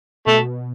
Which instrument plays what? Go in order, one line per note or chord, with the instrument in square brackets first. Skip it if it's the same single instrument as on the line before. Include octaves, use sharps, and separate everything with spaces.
[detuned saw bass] B2 [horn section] A3